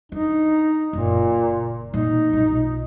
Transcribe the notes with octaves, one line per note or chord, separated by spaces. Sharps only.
D4 D#4
F#1 A#2
A#2 D#4
B1 F4